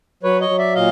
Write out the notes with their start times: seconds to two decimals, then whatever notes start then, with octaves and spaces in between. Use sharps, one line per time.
0.23 F#3 B4 C#5
0.41 C#5 D#5
0.49 F#3
0.58 D5 E5
0.75 A#2 D#5 F5